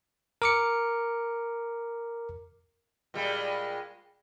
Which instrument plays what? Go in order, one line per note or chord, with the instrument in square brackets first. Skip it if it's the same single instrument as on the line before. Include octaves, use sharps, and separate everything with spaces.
[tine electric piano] A#4 D6 C#7
[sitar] A#2 G3 G#3